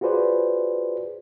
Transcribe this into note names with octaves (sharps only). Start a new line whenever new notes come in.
F4 F#4 G#4 B4 C5 D5